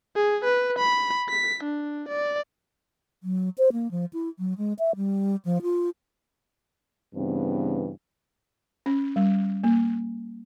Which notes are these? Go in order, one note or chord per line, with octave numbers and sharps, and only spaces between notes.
G#4
B4
B5
B6
D4
D5
F#3
C5
A#3
F3
E4
F#3
G#3
E5
G3
F3
F4
G2 C#3 E3 B3 C4
C#4
G3
A#3